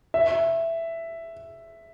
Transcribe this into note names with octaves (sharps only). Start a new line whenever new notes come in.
E5